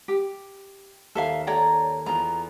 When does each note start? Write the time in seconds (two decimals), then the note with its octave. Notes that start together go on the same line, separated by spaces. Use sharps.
0.08 G4
1.15 D#2 A4 E5 F5
1.47 D#2 A4 C#5 D5 G5 A#5
2.06 E2 F4 A#5